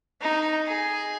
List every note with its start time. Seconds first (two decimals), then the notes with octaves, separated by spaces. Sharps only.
0.22 D#4
0.67 G#4